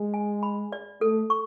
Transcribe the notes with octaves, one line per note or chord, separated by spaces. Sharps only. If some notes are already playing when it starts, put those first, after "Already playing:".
Already playing: G#3
G#5
B5
D5
A3 A4
C#6